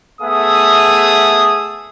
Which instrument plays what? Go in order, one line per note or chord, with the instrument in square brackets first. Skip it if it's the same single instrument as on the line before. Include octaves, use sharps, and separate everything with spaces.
[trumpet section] A3 B3 G#4 E5 D#6